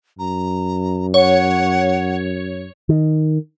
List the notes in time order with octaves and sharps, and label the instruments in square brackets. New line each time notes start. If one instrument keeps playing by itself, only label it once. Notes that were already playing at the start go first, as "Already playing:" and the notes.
[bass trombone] F#2 [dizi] A#5
[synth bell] C#5 [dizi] F#5
[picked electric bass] D#3